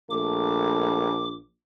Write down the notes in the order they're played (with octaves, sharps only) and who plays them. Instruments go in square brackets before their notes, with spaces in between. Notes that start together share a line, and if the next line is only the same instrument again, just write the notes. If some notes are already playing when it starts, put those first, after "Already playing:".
[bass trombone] A#1 [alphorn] A3 [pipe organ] D6